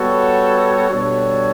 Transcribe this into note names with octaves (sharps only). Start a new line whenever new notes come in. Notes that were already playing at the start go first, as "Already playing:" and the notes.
Already playing: G3 B3 F#4 A4 C#5
B2 G3 D4 A4 C#5